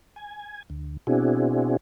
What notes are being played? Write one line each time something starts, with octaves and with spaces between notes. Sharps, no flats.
G#5
D2
B2 C4 D4 E4 F#4 G#4